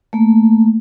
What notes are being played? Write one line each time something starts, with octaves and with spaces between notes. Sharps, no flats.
A3 A#3